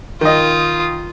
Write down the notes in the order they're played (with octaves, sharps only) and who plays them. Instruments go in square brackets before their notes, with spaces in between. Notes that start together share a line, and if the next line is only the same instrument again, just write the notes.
[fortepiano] D#3 D#5 [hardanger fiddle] F4 D#6